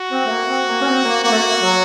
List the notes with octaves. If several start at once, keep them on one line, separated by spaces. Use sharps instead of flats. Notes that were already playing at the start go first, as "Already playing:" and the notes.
Already playing: F#4
C4
A3
A#3
C4
A#3
C#4
C4
A#3
A#3 F#4
A3
A#3
F#3